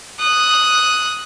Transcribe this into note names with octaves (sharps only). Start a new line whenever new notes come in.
D#6 F#6